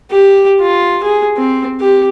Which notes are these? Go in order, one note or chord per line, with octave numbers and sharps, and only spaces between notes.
G4
F4
G#4
C4
G4